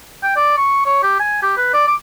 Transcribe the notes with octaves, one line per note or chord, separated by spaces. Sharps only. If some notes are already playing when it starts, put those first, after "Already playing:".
G5
D5
C#6
C#5
G4
G#5
G4
B4
D5
D6